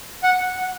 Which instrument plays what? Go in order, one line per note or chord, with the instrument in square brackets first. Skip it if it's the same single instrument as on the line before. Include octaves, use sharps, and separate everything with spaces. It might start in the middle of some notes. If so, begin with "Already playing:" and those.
[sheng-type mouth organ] F#5